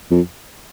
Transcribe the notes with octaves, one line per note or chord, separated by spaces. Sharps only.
F2